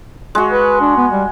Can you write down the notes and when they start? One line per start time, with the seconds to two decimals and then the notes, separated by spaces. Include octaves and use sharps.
0.35 G#3 F#4
0.51 B4
0.81 D4
0.97 B3
1.12 G3